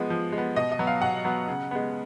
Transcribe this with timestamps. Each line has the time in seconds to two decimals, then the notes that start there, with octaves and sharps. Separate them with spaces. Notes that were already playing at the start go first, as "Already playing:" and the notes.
Already playing: F3 G#3 B3
0.10 F3
0.32 G#3
0.38 B3
0.56 B2 D#5
0.72 D#5
0.79 F#3 B3
0.87 F5
1.02 B2 F#5
1.25 F#3 B3
1.48 C#3
1.71 G#3 B3